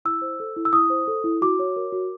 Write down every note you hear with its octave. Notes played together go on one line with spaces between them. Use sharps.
E4 E6
C5
A4
E4
E6
E4 D#6
C5
A4
E4
F#4 D6
C#5
A#4
F#4